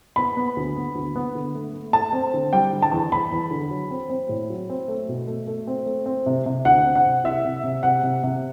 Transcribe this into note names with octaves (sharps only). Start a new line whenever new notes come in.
B3 B5
B3
D2
B3
D2
B3
D3
A3
A3
A3 A5
C4
D3
G3 G5
D3
A5
E2
E2 B5
E2
D3
F#3
C4
C4
A2
F#3
C4
A3
B2
A3
A3
C4
A3
C4
C3
C3
D2 F#5
C4
F#5
C3
C2 E5
C3
C3
C3 F#5
C3
C3